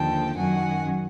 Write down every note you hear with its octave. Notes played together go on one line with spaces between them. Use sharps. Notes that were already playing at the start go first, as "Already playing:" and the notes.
Already playing: D#2 D3 F3 G5 A5
F#2 D#3 F#3 F#5 G#5